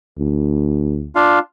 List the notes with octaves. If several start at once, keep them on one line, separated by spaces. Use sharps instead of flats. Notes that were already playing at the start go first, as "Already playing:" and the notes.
D2
D4 F4 F5